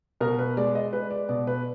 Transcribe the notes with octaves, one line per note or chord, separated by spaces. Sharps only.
B2 A#4
B4
G#3 D5
D#5
G#3 B4
D5
B2 D5
B4